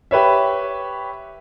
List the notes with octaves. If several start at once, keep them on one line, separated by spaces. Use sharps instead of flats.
G4 B4 C#5 E5